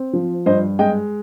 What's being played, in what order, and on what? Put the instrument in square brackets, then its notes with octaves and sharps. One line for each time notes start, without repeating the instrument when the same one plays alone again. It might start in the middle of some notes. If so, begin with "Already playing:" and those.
Already playing: [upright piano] C4
F3
G2 C5 D#5
G#3 D#5 G5